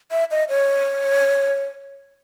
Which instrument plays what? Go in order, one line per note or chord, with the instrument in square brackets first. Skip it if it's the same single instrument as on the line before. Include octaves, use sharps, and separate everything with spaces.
[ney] E5
D#5
C#5